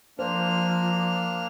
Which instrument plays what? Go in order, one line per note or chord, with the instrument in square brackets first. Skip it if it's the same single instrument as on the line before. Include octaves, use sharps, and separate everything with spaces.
[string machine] F3 [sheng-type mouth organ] A#3 D4 F6 [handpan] C5